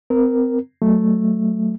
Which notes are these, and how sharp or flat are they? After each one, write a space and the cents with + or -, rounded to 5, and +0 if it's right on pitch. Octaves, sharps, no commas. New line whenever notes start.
C4 -30 A#4 +0
F#3 +5 A3 +0